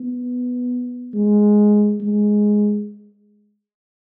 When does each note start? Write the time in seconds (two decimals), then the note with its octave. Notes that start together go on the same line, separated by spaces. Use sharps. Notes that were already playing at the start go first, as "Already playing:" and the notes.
Already playing: B3
1.14 G#3
2.00 G#3